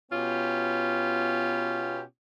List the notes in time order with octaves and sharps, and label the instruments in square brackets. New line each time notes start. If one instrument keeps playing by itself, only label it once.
[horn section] B2 B3 C#4 F4 G4